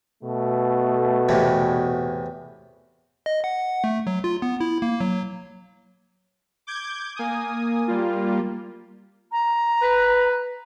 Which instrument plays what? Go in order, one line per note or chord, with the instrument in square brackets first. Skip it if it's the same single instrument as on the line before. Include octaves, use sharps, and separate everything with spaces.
[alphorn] B2 [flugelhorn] A3
[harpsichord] E2 A2 C3
[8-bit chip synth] D#5
F#5
A3
F#3
F4
B3
E4
A#3
F#3
[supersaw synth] D6 G6 G#6
A#3 G#5 D#6
G3 A#3 F4
[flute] A#5
[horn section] B4